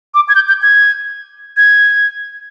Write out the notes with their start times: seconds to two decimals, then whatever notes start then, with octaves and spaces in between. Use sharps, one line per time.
0.14 D6
0.29 G#6
0.35 G6
0.49 G6
0.62 G#6
1.57 G#6